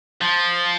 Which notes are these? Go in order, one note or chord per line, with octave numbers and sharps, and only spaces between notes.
F3